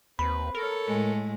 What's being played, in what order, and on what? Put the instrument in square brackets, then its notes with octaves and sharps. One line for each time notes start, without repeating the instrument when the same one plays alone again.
[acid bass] D#2 [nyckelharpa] C4 B4 [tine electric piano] B5
[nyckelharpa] A4 C#5 [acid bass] A#4
[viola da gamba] A2 G#3